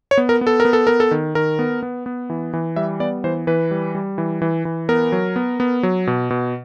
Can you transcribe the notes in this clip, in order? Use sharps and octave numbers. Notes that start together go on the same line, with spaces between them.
C#5
B3
A#4
B3
A4
A#4
B3
A4
B3 A#4
A4
D#3
D#3 A#4
B3
B3
B3
E3
E3
G3 E5
B3 D5
E3 C5
E3 B4
G3
G3
E3
E3
E3
B3 A#4
F#3
B3
B3
F#3
B2
B2